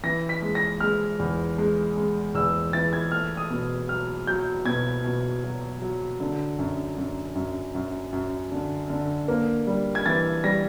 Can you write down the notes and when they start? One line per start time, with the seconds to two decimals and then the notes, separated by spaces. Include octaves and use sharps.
0.03 E3 A#6
0.29 B6
0.42 G#3
0.55 A#6
0.80 G#3 F6
1.19 E2
1.58 G#3
1.97 G#3
2.34 E2 E6
2.73 E3 A6
2.93 G#6
3.12 A3 F6
3.37 D#6
3.50 B2
3.89 F#3 F6
4.27 F#3 G6
4.65 B2 G#6
5.04 B2
5.44 F#3
5.82 F#3
6.20 D3
6.59 F#2
6.98 F#2
7.35 F#2
7.75 F#2
8.13 F#2
8.52 D3
8.90 D3
9.28 A#3
9.67 G3
9.95 G#6
10.06 E3 A6
10.44 G3 A#6